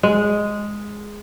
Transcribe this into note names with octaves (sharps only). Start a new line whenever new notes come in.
G#3